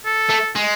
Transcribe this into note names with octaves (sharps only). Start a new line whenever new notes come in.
A4
A3
G#3